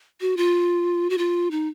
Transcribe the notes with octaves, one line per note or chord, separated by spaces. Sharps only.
F#4
F4
F#4
F4
D#4